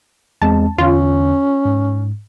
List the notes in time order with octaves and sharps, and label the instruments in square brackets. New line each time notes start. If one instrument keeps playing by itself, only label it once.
[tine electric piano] E2 G#3 C4 [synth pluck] A5
[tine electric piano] E2 D3 [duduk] C#4 [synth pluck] F4
[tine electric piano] G#2